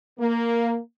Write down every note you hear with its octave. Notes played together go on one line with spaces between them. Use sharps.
A#3